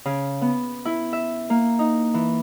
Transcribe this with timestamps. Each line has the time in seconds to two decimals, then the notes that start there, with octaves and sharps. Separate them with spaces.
0.05 C#3
0.41 B3
0.85 E4
1.13 E5
1.50 A#3
1.79 D#4
2.14 E3